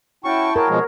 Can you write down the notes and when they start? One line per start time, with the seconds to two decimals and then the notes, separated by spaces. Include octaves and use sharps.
0.25 C#4 E4 F#4 G5 A5 C#6
0.56 F#4 G#4 A#4 C#5
0.69 B2 F3 G#3